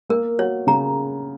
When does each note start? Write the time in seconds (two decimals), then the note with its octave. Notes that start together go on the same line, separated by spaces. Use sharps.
0.09 A#3 A#4
0.39 F#4 C#5
0.67 C#3 A#5